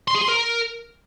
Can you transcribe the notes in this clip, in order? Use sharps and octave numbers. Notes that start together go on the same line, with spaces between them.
C6
G#4
C6
A#4